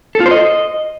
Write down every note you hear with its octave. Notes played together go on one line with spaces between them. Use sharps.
A4
F4
C5
D#5